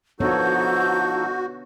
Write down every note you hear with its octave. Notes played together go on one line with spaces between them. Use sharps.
F3 B3 D4 D#4 F#4 A4 C#5 G6